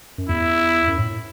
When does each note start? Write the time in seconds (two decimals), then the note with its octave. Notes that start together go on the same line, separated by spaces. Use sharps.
0.18 F#2
0.29 E2 E4
0.88 F#2
0.98 A2